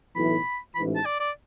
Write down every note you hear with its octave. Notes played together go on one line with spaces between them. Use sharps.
B1 A2 E3 B5
A1 G#2 E3 B5
A5
D5
D5